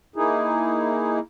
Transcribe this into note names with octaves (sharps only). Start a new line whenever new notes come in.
A#3 D#4 E4 G#4